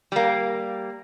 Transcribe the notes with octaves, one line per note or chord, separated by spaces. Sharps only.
G3 A#3